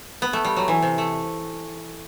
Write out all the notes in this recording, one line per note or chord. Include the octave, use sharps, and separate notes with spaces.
B3
A3
G3
F#3
E3
C3
A3